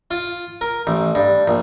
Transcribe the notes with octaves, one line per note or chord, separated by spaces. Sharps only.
F4
A#4
A1
G2
A#1